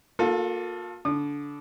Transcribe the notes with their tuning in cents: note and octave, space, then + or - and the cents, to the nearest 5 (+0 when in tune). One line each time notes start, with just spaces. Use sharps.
A#3 +0 F4 +45 A4 +0
D3 -25 D#6 -35